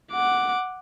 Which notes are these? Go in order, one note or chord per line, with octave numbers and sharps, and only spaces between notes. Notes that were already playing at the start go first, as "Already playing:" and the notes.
F#5 D6